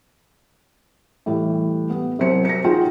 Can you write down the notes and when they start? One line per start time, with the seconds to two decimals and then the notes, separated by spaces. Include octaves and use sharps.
1.26 A2 E3 G3
1.90 B3
2.19 C2 F#3 C5 C#7
2.45 A#6 C#7
2.64 D#4 F4 F#4 G#4 F#5 G5